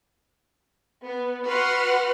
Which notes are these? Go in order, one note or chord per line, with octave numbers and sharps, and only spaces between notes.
B3
F#4 B4 F#5 C6 F6